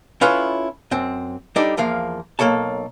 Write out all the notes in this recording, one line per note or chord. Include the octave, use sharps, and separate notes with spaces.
C#4 E4 F4 A4 B4 C#5
F#2 C4
G3 D4 D#4 A4 D5
E2 F3 A#3 F5
B1 A#3 A4 C#5 A5